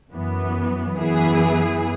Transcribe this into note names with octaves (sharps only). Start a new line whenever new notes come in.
F#2 E3 B3
F#2 E3 B3 E4 G#4